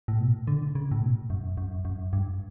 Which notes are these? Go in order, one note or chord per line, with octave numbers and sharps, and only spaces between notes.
A2
B2
D3
C#3
A2
B2
F#2
F#2
F#2
G2